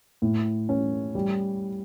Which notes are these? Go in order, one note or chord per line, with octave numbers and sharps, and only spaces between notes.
A2
C#4
G3